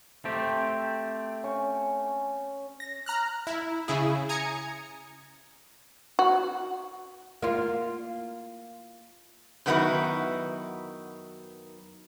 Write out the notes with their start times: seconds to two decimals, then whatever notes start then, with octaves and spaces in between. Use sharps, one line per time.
0.25 A3 C4 G4
1.44 C#4 G#5 C#6
2.80 A#6
3.06 A#5 F6 F#6
3.47 E4
3.88 C#3 E4 G#4
4.29 G#5 A#5 D#6 G#6 C#7
6.19 F#4
7.42 A#3 F4
9.66 F#2 D#3 B3 E4 F#4 B4